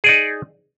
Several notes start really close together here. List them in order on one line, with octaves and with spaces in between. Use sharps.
G#4 D5 D#4